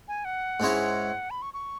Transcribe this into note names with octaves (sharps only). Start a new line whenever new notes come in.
G#5
F#5
G#2 G#3 C#4 E4 C#5
B5
C#6
C#6